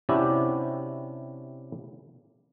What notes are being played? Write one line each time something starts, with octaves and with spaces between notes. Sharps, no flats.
C3 C#4 D4 E4 F#4 G4